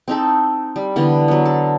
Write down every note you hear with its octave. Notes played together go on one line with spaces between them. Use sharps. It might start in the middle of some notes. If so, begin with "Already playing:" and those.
C4 D#4 A4
G3
D3 E3 B3
F#3 B3
A4